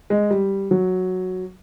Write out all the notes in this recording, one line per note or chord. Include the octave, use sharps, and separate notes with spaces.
G#3
G3
F#3